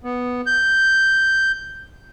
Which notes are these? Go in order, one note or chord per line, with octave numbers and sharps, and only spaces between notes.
B3
G6